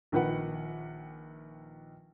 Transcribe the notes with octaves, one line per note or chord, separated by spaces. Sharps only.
A#1 D#3 B4 F#5